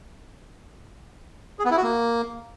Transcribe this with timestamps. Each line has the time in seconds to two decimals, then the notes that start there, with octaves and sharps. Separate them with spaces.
1.59 G#4
1.65 B3
1.71 E4
1.77 F#4
1.83 A#3